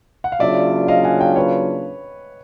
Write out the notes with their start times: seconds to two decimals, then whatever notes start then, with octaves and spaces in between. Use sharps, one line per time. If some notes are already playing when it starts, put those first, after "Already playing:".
0.24 F#5
0.32 F5
0.40 C#3 F#3 A#3 D4 F4 D5 E5
0.88 D#5 F5
1.04 F#5 G#5
1.20 F5 G5
1.36 B4 C#5